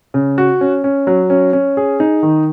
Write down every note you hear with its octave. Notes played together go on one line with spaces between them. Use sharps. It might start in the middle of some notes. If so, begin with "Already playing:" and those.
C#3
F#4
C#4
C#4
F#3
C#4
C#4
G#4
D#4
D#3